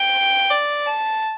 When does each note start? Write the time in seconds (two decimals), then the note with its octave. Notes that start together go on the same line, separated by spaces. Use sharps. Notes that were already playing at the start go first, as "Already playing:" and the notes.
Already playing: G5
0.50 D5
0.86 A5